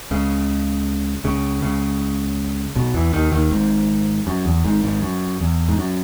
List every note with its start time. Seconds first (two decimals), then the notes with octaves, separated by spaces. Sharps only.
0.11 C#2 C#3
1.24 C#2 C#3
1.62 C#2 C#3
2.75 B1 B2
2.94 E2 E3
3.13 D#2 D#3
3.32 D#2 D#3
3.51 G#1 G#2
4.27 F#2
4.45 E2
4.64 G#1 G#2
4.84 G#1 G#2
5.02 F#2
5.40 E2
5.69 G#2
5.78 F#2